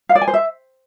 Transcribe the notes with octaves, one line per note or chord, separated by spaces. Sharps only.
F5
D5
G#5
C5
E5